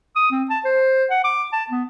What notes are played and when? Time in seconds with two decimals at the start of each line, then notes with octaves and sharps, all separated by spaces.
0.16 D#6
0.32 C4
0.50 A5
0.65 C5
1.11 F#5
1.24 D6
1.53 A5
1.70 B3